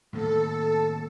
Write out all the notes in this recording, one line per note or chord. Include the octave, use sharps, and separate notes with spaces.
A2 D#3 A#3 A4